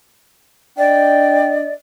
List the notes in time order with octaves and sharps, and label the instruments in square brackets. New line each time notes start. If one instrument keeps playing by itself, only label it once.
[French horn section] D4 D#5 [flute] D5 [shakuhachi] G5